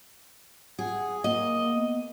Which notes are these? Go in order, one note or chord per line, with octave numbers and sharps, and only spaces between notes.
G#4 F#5
A#3 D#5
B3